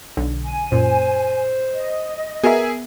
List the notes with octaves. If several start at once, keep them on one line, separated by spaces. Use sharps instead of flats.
B1 D3
G#5
F#2 A#2 C5
D#5
B3 G#4 A#4 E5